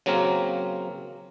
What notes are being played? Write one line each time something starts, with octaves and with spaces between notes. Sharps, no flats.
C#3 F#3 A#3 C4 A#4